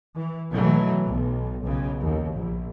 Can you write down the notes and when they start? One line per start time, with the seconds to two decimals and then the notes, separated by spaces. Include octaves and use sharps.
0.16 E3
0.52 B2 E3 F#3 A3
1.05 B1
1.64 B1 C#3
2.00 D#2
2.34 A#1